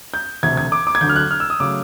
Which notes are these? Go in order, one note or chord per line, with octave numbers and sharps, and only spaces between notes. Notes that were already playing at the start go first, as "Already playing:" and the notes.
G6
E1 D2 C3 G#6
G#6
D6
D6
G#6
D2 D3 F#3 G6
F6
F#6
F6
E6
D#6
C#3 F#3 A3 D6